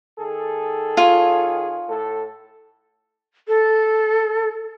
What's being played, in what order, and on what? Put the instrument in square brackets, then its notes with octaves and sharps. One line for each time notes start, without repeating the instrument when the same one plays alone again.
[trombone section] D#3 G#4 A4
[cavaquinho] F4 C#5
[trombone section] A2 A4
[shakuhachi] A4